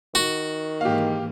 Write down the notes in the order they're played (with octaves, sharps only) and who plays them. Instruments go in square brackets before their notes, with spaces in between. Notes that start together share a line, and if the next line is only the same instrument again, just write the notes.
[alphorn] D#3 [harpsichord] F#4
[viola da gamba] G#2 E3 A#3 [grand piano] G4 F5